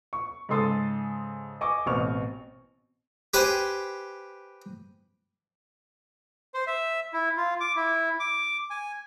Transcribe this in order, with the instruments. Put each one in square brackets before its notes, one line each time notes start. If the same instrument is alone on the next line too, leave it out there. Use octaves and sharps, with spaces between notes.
[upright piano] C#6
G#2 C#3 A4 C6 D#6 A6
D#5 G#5 C#6 D6
A1 B2 C4 C#6 F6 F7
[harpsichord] G4 B4 C5 G5 G#5
[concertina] C5
E5
E4
F4
D6
E4
D6
G#5